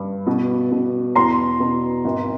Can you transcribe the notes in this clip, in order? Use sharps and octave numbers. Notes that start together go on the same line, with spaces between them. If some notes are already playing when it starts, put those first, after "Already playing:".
Already playing: G2
B2
B2
E2 A#5 C6
B2
G#1